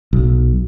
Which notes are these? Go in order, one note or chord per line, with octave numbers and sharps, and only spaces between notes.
B1